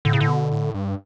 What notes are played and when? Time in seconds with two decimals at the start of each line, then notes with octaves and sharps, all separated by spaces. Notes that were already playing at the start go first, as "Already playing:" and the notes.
0.05 A2 D3
0.13 C#3
0.20 A2 D3
0.28 B2
0.51 A2
0.74 G2